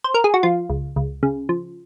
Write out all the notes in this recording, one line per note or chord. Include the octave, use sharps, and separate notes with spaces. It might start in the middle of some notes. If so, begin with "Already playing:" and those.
C5
A#4
G#4
F#4
F3 F4
C#2
C#2
C#3
F3